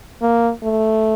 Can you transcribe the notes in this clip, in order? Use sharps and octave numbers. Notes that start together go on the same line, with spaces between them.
A#3
A3